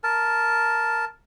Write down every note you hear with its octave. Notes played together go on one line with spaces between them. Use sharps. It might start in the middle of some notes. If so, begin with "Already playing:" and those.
A#4 A5